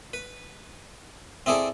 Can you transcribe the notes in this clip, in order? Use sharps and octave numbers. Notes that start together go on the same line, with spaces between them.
B4
C4 E4 G#4 A4 D5